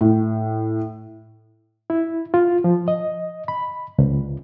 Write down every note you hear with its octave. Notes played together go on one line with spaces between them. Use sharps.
A2
E4
F4
F3
D#5
B5
C#2